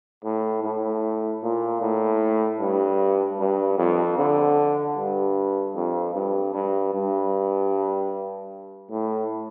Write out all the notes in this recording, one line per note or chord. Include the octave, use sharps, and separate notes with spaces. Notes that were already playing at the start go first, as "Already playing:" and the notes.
A2
A2
A#2
A2
G2
G2
F2
D3
G2
F2
G2
G2
G2
A2